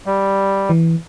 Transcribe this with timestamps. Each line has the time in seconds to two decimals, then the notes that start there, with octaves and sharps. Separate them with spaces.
0.06 G3
0.69 E3